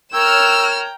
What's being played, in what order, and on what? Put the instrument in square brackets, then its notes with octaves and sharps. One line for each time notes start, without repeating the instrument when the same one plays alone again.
[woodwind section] A#4 C#5 [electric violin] G5 A#5 [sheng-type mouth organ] E6 [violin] F6 E7